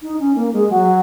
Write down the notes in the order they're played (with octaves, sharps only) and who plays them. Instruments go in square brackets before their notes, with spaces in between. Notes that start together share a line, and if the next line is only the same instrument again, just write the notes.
[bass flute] D#4
C#4
A#3
G#3
F#3